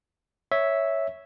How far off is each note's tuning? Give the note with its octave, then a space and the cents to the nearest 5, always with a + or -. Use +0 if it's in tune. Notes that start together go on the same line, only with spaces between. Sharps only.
C#5 +0 E5 -5